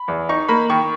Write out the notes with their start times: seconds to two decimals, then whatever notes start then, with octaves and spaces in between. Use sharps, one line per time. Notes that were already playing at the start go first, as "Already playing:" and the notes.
Already playing: B5
0.08 E2
0.29 D#4 C#6
0.49 A#3 B5
0.70 D#3 C#6